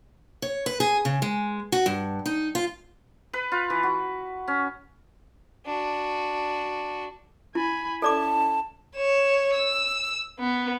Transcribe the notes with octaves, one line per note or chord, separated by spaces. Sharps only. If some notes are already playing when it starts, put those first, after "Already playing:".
C#5
B4
G#4
C#3
G#3
F#4
G2
D#4
F4
B4
F4
E3
F#4
C#4
D4 F#4
E4 G#5 B5
C#4 E4 A4 D5 A5 D6
C#5 E7
E6
B3